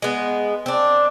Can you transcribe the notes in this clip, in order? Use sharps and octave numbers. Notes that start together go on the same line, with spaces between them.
G#3 B3
C4 D4